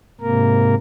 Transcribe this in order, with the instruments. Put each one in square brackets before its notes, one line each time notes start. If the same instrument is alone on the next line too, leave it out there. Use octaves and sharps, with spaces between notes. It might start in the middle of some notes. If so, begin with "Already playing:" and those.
[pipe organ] G#2 C3 A#3 A#4